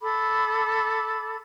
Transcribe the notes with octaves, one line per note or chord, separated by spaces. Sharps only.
A4 B5 D6